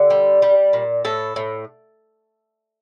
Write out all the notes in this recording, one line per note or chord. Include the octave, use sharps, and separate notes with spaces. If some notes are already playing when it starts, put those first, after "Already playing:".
Already playing: D3 G4
G3
G3
A#2
A2 A4
A2